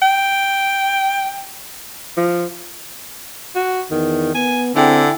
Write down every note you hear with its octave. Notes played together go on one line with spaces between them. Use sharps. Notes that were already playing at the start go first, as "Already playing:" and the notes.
G5
F3
F#4
E2 D#3
B3 G#5
D3 C4 E4 G4 G#4 F#5